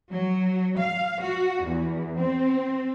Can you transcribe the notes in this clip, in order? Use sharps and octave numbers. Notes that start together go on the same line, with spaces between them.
F#3
F5
F#4
E2
C4